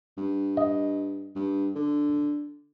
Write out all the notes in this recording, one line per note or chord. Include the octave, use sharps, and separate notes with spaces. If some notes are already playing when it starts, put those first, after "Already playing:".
G2
D#5
G2
D3